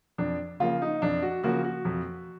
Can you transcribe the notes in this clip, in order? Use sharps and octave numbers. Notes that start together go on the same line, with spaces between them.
F2 D4
C#3 F3 A#3 F4
D#4
F2 D4
F#4
C#3 F3 A#3 F#4
F#4
F2